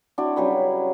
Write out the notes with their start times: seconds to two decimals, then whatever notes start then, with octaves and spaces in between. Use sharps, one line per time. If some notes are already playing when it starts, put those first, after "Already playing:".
0.18 C4 D4 E4 F#4
0.36 C#3 F#3 G3 B4